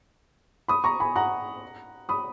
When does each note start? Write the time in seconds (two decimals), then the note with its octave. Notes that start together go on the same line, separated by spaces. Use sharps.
0.68 B5 D#6
0.84 A#5 C#6
1.00 G#5 B5
1.16 F#5 A#5
2.09 B5 D#6